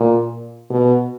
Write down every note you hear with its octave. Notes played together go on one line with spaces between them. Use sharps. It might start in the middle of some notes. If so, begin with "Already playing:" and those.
Already playing: A#2
B2